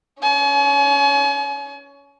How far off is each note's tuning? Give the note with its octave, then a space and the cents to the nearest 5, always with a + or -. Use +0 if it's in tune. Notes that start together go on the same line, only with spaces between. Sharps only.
C#4 +20 G#5 +40